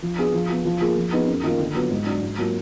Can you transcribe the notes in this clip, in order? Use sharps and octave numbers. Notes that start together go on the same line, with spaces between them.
F3
B3 D4 G#4
F3
B3 F4
F3
A#3 F4 G#4
F3
B3 D#4 G#4
F#2
D#3 A#3 F4
D3
F#3 B3 F4
G#2
F#3 D4 F#4
G#2
F#3 A#3 F4